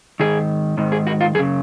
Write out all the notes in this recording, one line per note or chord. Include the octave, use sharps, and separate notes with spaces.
G#2 D#3 G#4
G#2 D#3
G#4
F#4
F4
F#2 C#3 G#4